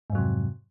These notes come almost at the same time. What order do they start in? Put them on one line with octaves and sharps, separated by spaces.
G#2 F2 F#3 C3